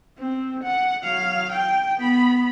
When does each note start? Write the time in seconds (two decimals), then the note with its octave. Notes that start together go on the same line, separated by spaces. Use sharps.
0.19 C4
0.63 F#5
1.04 F#3 F5
1.52 G5
1.97 B3 B5